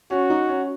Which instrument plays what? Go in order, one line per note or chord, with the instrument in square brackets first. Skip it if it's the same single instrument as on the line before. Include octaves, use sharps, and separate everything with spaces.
[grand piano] C#4 [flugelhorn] F#4
[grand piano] D#4
C#4